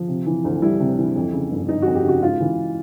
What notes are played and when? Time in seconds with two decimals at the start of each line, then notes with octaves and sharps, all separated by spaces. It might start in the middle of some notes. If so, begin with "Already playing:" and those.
Already playing: F3
0.08 C3
0.26 E3
0.44 D2
0.62 G3 E4
0.80 C3
0.98 E3
1.16 F2
1.33 C#3
1.51 G1
1.69 G1 D#4
1.82 F2 F#4
1.95 G4
2.04 C#3 F#4
2.23 G#2 F4
2.41 E3